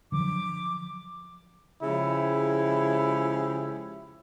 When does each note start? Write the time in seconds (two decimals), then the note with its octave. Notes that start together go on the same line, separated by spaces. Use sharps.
0.12 D3 F3 F#3 D6
1.83 C#3 F3 G#3 E4 G4